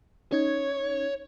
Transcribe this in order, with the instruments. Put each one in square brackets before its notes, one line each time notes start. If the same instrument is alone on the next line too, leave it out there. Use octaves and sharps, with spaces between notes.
[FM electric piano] C#4 D#4 G#6 [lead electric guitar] C#5